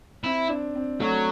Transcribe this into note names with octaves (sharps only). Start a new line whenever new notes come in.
C4 E4
D4
C4
F#3 A3